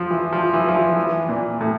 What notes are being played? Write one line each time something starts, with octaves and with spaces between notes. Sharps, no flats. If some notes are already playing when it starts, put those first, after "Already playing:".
Already playing: F3
E3
F3
E3
F3
E3
E3
A#2
A2